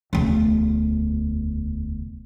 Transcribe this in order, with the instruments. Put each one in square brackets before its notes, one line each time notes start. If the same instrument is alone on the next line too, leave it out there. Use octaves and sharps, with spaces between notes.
[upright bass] E1 D2